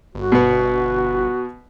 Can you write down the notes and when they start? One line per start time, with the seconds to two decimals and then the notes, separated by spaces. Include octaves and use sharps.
0.15 G1 F#4
0.32 B2 B3